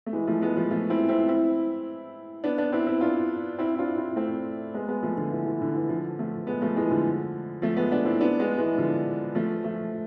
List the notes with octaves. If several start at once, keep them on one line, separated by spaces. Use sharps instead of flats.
A3
E3 G#3
F3 A3
G#3 B3
F3 A3
F3 A3
C4 E4
C4 E4
C4 E4
B3 D4
B3 D4
C4 E4
C4 E4
D4 F4
C4 E4
E4
D4 F4
C4 E4
A3 C4
G#3 B3
G#3 B3
F3 A3
D3 F3
E3
E3
D3
E3
D3 F3
F3 A3
G#3 B3
F3 A3
E3 G#3
D3 F3
F3 A3
G#3 B3
B3 D4
C4 E4
B3 D4
G#3 B3
E3 G#3
D3 F3
F3 A3
F3 A3